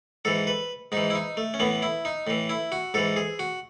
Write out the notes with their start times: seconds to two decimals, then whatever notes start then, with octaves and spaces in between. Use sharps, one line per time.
0.25 G#2 E3 A4
0.47 B4
0.92 G#2 E3 D#4
1.10 E4
1.15 D#4
1.37 A3
1.54 C#4
1.60 A2 E3 B3
1.82 E4
2.05 D#4
2.27 A2 E3
2.49 E4
2.72 F#4
2.94 G#2 E3 A4
3.17 G#4
3.39 F#4